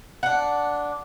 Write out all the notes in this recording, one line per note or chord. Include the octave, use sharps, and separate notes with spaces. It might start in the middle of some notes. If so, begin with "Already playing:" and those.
D4 F#5